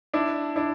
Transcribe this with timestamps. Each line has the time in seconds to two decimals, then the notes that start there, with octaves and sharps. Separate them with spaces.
0.13 D4 E4
0.56 D4 E4